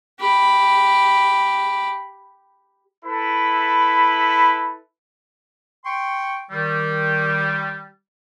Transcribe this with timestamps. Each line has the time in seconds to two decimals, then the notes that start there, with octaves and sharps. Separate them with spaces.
0.20 G4 B5
3.05 E4 A4 B4 B5
5.85 G5 C6 C#6
6.51 D#3 G3